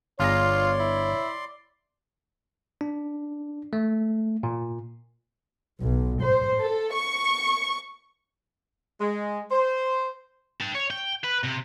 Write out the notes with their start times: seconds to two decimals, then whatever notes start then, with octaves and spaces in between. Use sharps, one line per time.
0.20 G1 F4 G#4 C#5 D5 A#5 C6
0.79 E4
2.81 D4
3.73 A3
4.43 A#2
5.83 B1
6.23 C5
6.61 A4
6.94 C#6
9.00 G#3
9.51 C5
10.61 G4 A5
10.75 C#5
10.91 G5
11.24 B4
11.44 C3